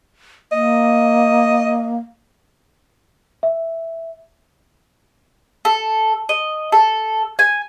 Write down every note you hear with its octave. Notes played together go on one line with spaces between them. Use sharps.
A#3 D#5
E5
A4
D#5
A4
G#5